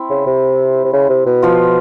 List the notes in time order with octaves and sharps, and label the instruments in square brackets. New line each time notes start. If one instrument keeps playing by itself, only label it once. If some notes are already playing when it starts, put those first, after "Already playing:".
Already playing: [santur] C4 E4
[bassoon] C#3
C3
C3
C#3
C3
B2
[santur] F3 F4